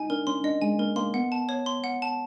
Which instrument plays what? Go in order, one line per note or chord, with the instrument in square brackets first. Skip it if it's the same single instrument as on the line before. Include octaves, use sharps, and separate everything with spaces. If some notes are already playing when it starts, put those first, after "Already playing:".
Already playing: [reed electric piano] D#4 [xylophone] G#5
[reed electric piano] D4 [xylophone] A#4
[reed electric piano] C#4 [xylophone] C6
[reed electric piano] D4 [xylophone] D#5
[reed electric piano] G#3 [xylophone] G#5
[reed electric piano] A#3 [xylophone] A#4
[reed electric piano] A#3 [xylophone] C6
[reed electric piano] B3 [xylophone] F#5
[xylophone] A5
C#5
C6
F#5
A5